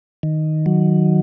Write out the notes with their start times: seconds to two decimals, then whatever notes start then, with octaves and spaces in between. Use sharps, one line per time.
0.23 D#3
0.66 F#3